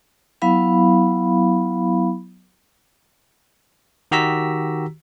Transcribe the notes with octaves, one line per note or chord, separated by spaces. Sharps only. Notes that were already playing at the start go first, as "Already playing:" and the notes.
F#3 B3 E4 F5 B5
D#3 F#4 G4 A#5 E6 B6